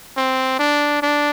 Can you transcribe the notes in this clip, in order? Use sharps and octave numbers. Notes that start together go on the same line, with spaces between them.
C4
D4
D4